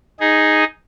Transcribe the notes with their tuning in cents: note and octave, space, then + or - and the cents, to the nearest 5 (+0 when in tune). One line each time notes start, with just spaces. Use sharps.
D#4 +0 G#4 +0